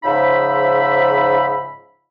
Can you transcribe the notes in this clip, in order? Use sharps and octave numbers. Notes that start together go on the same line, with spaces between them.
G#2 C#3 F3 D#4 E5 B5